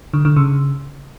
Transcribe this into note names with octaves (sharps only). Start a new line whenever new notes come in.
D3
D3
C#3